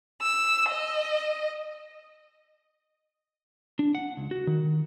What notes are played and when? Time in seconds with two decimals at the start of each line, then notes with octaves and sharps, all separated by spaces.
0.20 E6
0.70 D#5
3.79 D4
3.95 F#5
4.17 C#2
4.31 F#4
4.47 D#3